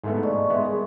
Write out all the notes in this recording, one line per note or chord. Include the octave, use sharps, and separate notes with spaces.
G#2 A3 B3
D5 D#5 C#6
G#3 B3 E5 C6
G3 G#4 A#4